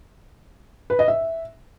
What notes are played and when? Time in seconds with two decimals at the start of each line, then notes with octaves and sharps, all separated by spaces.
0.90 B4
0.99 D#5
1.08 E5